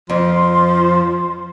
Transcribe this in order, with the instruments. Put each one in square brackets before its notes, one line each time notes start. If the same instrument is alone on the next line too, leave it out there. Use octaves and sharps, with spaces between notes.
[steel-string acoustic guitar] F2 [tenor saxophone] F3 [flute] C6